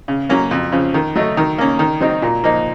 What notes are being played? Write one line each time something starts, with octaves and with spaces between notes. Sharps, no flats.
C#3
F#3 A#3 C#4
F2
C#3 F3
D#3
F#3 A3 D#4
D#3
A#3 C#4
D#3
F#3 C4 D#4
A#2
F3 A#3 D#4